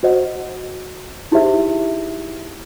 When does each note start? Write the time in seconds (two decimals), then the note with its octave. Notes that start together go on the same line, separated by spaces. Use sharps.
0.03 F#4 C5 D#5 F#5
1.31 D#4 E4 G4 G#4 C5 E5